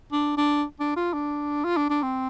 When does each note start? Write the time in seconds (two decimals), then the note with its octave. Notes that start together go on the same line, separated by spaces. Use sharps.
0.12 D4
0.37 D4
0.80 D4
0.97 F4
1.14 D4
1.65 F4
1.77 D4
1.90 D4
2.03 C4